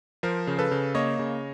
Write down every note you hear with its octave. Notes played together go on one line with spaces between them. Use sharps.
F3 A#4 C5
C#3
A4 B4
C#3
A#3 C#5 D#5
C#3